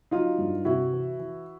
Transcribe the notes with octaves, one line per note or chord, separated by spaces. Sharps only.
F#3 D#4 F4
G2
C3 E4 F#4
E3
E3